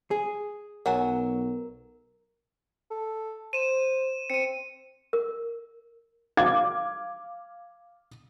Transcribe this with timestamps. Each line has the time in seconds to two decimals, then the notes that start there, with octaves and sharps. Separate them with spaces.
0.11 G#4
0.86 B1 F#3 A#4 F#5 G#5
2.91 A4
3.53 C5 D#7 E7
4.30 C4 C#7 D#7
5.13 A#4
6.37 F5 D6 G#6